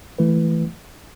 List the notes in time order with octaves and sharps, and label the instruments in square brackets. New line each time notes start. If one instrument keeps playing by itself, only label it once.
[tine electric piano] E3 A3 E4 B4